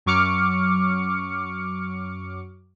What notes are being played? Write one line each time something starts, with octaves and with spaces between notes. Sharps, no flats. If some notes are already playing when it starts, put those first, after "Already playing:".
F#2 F#3 C#6 D6 F6 C#7